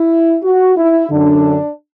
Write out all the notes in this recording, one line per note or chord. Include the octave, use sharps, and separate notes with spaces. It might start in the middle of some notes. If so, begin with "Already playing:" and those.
Already playing: E4
F#4
E4
F#2 D3 D4